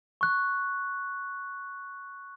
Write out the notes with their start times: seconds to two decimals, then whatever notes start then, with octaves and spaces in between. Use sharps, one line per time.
0.21 C#6 F#6